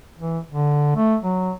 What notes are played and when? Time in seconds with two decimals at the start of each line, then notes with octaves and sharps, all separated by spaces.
0.19 E3
0.50 D3
0.96 A3
1.23 F#3